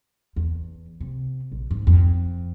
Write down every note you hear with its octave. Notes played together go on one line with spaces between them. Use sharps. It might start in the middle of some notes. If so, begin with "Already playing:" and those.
E2
C3
A#1
G#2
F2